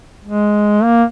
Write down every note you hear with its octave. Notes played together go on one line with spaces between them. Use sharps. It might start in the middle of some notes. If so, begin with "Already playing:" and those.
G#3
A#3